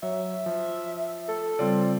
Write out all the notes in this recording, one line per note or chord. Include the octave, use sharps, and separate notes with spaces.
F#3 C#5 E5
F3
A4
C#3 G3 C4 F4 D5